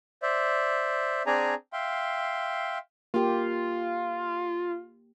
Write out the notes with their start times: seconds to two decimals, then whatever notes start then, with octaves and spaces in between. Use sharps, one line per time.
0.22 C5 D5 E5
1.26 C4 D4 G#4 D5 G#5 A#5
1.73 E5 F5 G5 C6
3.14 A#3 F4 G4